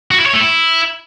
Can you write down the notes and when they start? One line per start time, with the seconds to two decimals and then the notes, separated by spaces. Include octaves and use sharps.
0.11 F#4
0.18 E4
0.26 C#5
0.33 A3
0.41 E4